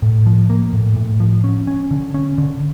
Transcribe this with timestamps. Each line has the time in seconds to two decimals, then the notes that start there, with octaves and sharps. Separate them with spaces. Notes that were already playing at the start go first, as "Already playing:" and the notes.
0.02 A2
0.26 F3
0.50 A#3
0.73 A2
0.96 A2
1.20 F3
1.44 C#4
1.67 C#4
1.91 D3
2.14 C#4
2.38 D3